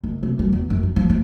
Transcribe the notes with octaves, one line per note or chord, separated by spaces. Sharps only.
F#1
C3
G3
E2
F#2
D#3
F3
G#3